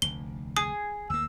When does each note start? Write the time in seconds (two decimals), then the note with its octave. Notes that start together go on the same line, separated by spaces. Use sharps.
0.02 F1 D2 G7
0.57 G#4 D#6
1.10 D2 A#3 E6